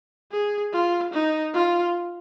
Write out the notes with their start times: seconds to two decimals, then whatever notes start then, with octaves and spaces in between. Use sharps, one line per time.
0.31 G#4
0.73 F4
1.13 D#4
1.54 F4